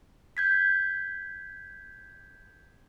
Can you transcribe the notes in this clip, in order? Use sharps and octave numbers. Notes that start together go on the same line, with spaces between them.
G6 G#6 B6